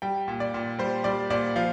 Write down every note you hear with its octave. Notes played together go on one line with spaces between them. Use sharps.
G3 G5
A#2
D5
A#2
G3 C5
G3 D5
A#2 D5
F3 F5